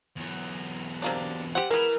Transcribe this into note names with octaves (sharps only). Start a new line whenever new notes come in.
E2 F#3
C3 A#3 D4
G4 C5 F#5
E3 G#3 B3 A#4